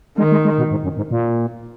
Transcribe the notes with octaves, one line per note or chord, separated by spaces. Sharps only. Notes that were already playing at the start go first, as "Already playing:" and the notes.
D#3 G#3
G#3
G#3
B2
G#2
F#2
G#2
A#2